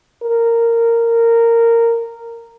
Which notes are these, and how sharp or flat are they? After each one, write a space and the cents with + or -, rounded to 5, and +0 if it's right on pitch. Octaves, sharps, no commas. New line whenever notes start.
A#4 -10